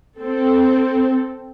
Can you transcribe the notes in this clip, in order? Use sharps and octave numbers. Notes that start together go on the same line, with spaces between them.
C4 A4